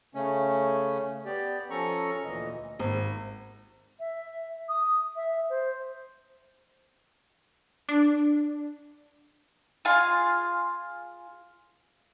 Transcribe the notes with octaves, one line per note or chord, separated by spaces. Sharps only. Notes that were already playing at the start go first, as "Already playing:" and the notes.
C#3 A3 C#4
B3 G4 D5
F3 C#4 A4 A#5 C#6
D2 A#2 E3 D#5
G#1
E5
D#6
E5
C5
D4
F4 G#4 F5 C6